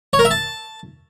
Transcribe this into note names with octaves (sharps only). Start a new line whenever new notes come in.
C#5
A#4
E5
A5